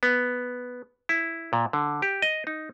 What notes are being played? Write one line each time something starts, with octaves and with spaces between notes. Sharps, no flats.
B3
E4
A#2
D3
G4
D#5
D#4